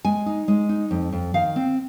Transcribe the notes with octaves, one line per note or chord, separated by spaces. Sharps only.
G#3 G#5
D#4
G#3
D#4
F2
F2
D#3 F5
C4